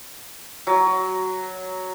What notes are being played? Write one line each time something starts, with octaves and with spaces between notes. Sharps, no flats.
F#3